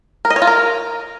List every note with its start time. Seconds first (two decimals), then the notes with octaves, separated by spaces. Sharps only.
0.25 A#4
0.30 D#5
0.36 C#5
0.42 F4
0.47 A#4